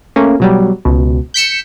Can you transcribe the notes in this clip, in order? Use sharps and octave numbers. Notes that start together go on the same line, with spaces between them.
A3 A#3 C#4
B2 F#3 G3
C#2 B2
G6 B6 C#7 E7